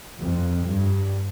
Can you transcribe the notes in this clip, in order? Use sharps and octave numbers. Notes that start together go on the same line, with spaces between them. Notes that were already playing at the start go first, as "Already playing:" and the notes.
F2
G2